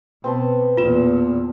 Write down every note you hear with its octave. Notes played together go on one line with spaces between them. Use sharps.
B2 C4 B4 A5
E2 A#2 F4 E7